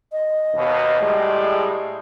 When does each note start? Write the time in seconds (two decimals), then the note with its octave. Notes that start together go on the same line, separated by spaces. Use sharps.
0.12 D#5
0.54 D#2 B2
1.00 A2 G3 G#3